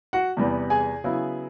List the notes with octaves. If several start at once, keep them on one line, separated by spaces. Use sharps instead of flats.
F#4 F#5
E2 C3 E3 G3 B3
G#4 G#5
C#3 F#3 B3 E4